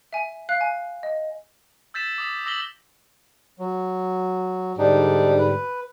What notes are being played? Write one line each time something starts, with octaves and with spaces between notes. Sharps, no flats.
E5 G#5
F5 F#6
G#5
D#5
E6 G6 A6 B6 E7
D6 D#6 B6
D6 E6 A#6 B6 F#7 G7
F#3
G#2 D3 G3 D4 D#4
B4